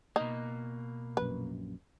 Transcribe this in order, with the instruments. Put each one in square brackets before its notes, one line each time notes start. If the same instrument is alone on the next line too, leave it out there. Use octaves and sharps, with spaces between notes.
[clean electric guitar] B2 A#3 [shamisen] D#4
[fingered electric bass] A#1 F#2 [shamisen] B4